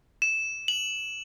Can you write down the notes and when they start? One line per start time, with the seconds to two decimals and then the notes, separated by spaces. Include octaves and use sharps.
0.22 E7
0.68 F#7